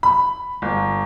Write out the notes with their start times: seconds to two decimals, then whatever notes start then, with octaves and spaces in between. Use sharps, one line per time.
0.03 B5
0.62 G1